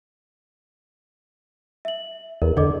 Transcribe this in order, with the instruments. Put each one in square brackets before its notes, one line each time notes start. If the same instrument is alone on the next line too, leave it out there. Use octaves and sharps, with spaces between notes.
[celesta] E5 F#7
[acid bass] E2 [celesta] A#4
[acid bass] D3 [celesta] D5 D#5 D6